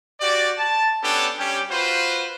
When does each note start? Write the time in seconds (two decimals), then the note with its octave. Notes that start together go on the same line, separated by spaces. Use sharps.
0.21 F#4 G4 D5
0.58 A5
1.03 B3 C#4 D4 G4 A4
1.38 G3 C#4 G4
1.71 F4 F#4 B4 C5